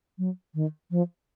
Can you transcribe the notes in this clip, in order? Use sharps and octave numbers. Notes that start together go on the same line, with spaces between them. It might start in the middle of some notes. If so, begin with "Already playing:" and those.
F#3
D#3
F3